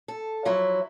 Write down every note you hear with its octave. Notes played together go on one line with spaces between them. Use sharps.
A4
F3 F#3 E4